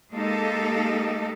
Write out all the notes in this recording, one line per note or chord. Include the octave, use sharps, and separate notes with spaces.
G#3 A#3 D#4 G4 A4